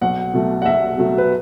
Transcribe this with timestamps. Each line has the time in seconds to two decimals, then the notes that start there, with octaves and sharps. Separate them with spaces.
0.01 B1 F#5
0.34 B2 F#3 A3
0.62 F#5
0.66 B1 E5
0.98 B2 F#3 A3
1.18 B4